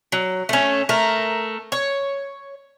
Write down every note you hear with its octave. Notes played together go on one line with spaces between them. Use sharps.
F#3
A3 C#4
A3 A#4
C#5